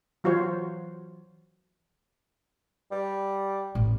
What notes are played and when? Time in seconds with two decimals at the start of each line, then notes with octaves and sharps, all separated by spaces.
0.24 E3 F#3 F4 F#4 C5 C#5
2.92 G3
3.75 A1